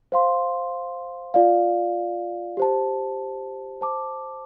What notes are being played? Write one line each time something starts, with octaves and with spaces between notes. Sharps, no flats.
C5 F5 C6
F4 D5 F5
G4 C5 A5
C5 A5 D6